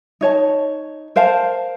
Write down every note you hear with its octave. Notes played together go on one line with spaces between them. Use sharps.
D#4 C#5 A5
A#4 C5 F5 A5